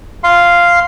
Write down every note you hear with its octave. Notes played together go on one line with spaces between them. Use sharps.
F5 C6